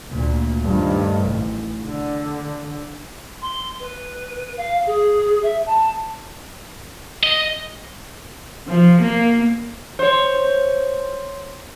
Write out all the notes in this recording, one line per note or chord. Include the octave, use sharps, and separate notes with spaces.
D2 A#2
G2 D#3 F3 A3
A1
D3
C6
B4
F5
G#4
E5
A5
D#5
F3
A#3
C5 C#5